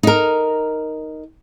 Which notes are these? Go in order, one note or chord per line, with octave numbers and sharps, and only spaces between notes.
D#4 A#4